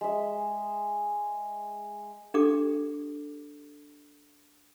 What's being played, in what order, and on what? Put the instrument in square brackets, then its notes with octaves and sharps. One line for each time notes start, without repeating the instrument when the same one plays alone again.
[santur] G#3 E5
[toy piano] D4 G4 A4 D6